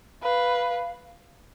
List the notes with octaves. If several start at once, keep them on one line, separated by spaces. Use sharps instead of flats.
B4 F5